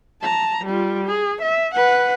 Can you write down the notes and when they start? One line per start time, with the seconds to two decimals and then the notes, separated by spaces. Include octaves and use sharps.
0.22 A5 A#5
0.65 G3 F4
1.05 G#4
1.42 E5
1.74 B4 F#5